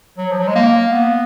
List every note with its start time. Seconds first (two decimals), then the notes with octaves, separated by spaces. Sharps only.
0.18 F#3
0.32 F3
0.39 F#3
0.48 G#3
0.55 A#3
0.92 B3